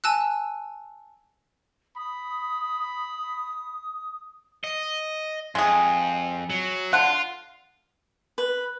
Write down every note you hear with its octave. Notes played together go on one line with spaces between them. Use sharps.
G#5 A5 E6 F#6
B5 D#6
D#5
F2 G#3 G#4
F#3
D3 F4 F#5
B4